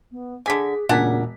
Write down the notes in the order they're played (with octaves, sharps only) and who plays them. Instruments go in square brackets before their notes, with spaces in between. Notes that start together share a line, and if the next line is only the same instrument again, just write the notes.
[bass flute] B3
[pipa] D3 G#5 [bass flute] G#4 [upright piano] D6 B6
[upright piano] E1 A#4 B6 [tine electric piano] A#2 [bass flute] C#3 [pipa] D4 F#5 G#5